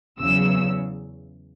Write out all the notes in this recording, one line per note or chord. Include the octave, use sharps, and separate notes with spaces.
E2 C#3 F#3 E6